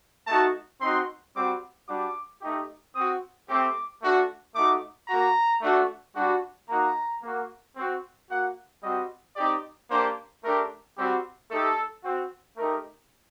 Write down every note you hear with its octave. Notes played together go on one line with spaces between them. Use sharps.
A3 D#4 F#4 A5
C4 D#4 F#4 C6
G3 C4 F#4 D6
G3 D4 F#4 D6
A3 D#4 G4
C4 F#4 D#6
A3 C4 G4 D6
A3 D4 F#4
A3 D#4 F#4 D6
A#3 F#4 A#5
A3 D4 F#4
G3 D4 F#4
A#3 D#4 F#4 A#5
A#3 F#4
C4 F#4
A#3 F#4 F#5
G3 C4 F#4 D#5
C4 D#4 G4 D5
A#3 D4 G4 C5
A3 D4 G4 A#4
G3 C4 F#4 G4
A3 D#4 G4 A4
C4 F#4
A3 D#4 G4 A#4